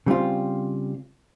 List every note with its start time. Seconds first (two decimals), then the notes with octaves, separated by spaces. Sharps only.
0.06 C#3 G3 C4 F4